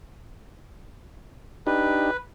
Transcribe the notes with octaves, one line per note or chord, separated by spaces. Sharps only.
D4 D#4 G4 B4